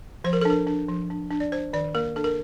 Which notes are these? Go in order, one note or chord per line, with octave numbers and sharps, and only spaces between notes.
F3 C5
A#4
A4
D4 A#4
D4
F3
D4
D4
D5
D4 C5
D#3 D5
A#3 A#4
D4 A4
A#4